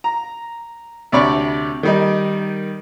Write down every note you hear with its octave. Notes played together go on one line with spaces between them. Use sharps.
A#5
D2 C3 C#5 D5 B5 C#6
D#3 G3 D#4